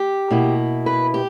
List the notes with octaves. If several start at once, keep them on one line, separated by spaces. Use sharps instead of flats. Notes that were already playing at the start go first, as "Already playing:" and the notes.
Already playing: G4
B2 A#3 E4
B4
G4